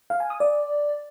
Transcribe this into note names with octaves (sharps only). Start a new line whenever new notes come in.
F5
G#5
D#6
D5